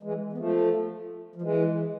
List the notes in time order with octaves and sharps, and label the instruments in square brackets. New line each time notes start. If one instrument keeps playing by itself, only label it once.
[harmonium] E3 G#3
B3
F3 A3
F3
E3 G#3